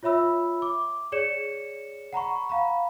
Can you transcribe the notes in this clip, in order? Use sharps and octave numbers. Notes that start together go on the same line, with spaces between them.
F4 C#5 E5 B5 E6
D6
G#4 C#5 D5 C#7 E7
F#5 A#5 B5 C#6
F5 A#5 B5